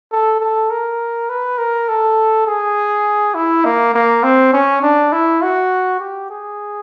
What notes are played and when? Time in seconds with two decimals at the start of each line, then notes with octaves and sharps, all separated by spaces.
0.12 A4
0.40 A4
0.70 A#4
1.29 B4
1.58 A#4
1.89 A4
2.47 G#4
3.35 E4
3.65 A#3
3.94 A#3
4.23 C4
4.53 C#4
4.82 D4
5.12 E4
5.42 F#4
6.00 G4
6.30 G#4